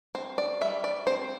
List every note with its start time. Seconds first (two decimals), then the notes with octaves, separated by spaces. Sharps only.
0.15 C4 C5
0.38 D5
0.61 G3 E5
0.84 D5
1.07 C4 C5